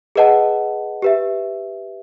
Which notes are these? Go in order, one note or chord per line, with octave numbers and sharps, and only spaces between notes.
G#4 B4 D#5 F#5 A5
G4 B4 E5